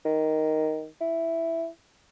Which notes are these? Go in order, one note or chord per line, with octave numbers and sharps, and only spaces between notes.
D#3
E4